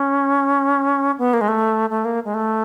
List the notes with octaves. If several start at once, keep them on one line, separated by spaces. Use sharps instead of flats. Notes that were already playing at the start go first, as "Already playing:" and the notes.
Already playing: C#4
B3
A#3
G#3
A3
A3
A#3
G#3
A3